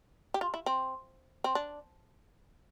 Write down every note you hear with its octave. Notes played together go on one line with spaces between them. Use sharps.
G4
F4
E4
C4
C4
D4